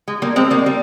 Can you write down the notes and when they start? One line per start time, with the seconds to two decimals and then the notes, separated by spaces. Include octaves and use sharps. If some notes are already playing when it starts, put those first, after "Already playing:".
0.08 G#3
0.22 G3 A#3
0.36 G#3 C4
0.50 G3 A#3
0.66 G3